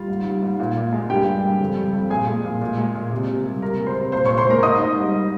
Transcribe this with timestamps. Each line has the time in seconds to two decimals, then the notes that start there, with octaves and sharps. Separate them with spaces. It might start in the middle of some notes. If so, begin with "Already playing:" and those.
Already playing: G3 F4 F5
0.08 G#2
0.25 G3
0.42 G#2
0.59 A#2
0.77 A#2
0.92 G#3
1.09 G2 G4 G5
1.27 G3
1.44 G2
1.61 F2
1.77 G3
1.94 F2
2.10 A#2 G#4 G#5
2.27 G#3
2.45 A#2
2.61 A#2
2.78 G#3
2.95 A#2
3.11 C3
3.28 C3
3.46 G3
3.62 C3 A#4 A#5
3.78 G#3
3.87 C5 C6
3.95 C3
4.12 A#2 C5 C6
4.25 A#2 C#5 C#6
4.37 C5 C6
4.47 G#3 A#4 A#5
4.63 G#2 D#5 D#6
4.80 G#2
4.97 G3